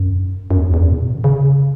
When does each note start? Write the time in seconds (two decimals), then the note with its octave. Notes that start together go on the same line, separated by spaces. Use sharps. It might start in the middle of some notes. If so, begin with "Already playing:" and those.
Already playing: F#2
0.51 F#2
0.58 E2
0.74 E2
0.80 F#2
0.92 B2
1.01 A2
1.15 D#3
1.24 C#3